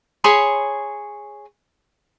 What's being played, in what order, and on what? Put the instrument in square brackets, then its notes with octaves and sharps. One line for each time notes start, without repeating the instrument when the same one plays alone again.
[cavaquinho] G#4 C#5 B5 C6